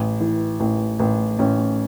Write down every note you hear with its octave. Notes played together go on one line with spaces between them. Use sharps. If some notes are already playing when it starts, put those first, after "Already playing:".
Already playing: A1
E3
A1
A1
A1 C#4